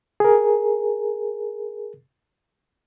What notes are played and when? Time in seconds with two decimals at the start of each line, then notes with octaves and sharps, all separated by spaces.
0.20 G#4 A#4